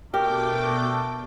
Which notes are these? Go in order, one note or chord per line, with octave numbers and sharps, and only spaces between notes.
B2 A3 D4 G4 A#4 G5 D6